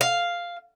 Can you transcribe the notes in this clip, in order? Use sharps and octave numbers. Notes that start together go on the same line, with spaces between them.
F5